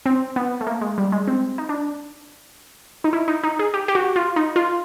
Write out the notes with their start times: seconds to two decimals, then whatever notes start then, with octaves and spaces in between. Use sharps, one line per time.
0.06 C4
0.36 B3
0.61 A3
0.67 A#3
0.81 G#3
0.98 G3
1.12 G#3
1.27 C4
1.58 D#4
1.69 D4
3.04 D#4
3.13 E4
3.28 D#4
3.43 D#4
3.59 G#4
3.74 G4
3.88 G4
3.95 F#4
4.16 F4
4.36 D#4
4.56 F4